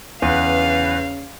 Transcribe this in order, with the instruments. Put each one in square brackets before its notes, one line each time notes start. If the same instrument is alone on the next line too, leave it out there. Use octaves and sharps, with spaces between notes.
[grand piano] E2 [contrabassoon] C#3 [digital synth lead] B4 [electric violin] F5